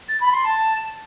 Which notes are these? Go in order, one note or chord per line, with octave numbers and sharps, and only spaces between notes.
A6
B5
C6
A5